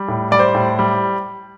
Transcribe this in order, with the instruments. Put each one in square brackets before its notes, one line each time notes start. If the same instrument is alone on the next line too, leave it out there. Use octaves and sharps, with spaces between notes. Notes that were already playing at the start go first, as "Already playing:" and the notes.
Already playing: [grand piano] G3
A2
G3 D5
C5
A2
G3